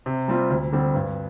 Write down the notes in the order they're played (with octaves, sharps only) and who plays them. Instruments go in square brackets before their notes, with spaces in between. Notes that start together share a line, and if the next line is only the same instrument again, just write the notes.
[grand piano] C3
G3 C4 F4
D2
D3 G3 C4
G2